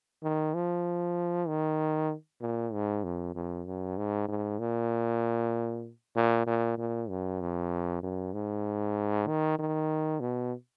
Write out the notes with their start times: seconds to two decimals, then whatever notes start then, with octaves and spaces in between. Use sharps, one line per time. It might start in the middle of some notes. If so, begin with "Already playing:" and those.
0.23 D#3
0.54 F3
1.48 D#3
2.41 A#2
2.73 G#2
3.04 F2
3.35 F2
3.66 F#2
3.97 G#2
4.28 G#2
4.59 A#2
6.16 A#2
6.47 A#2
6.78 A#2
7.09 F#2
7.41 F2
8.03 F#2
8.34 G#2
9.27 D#3
9.59 D#3
10.20 B2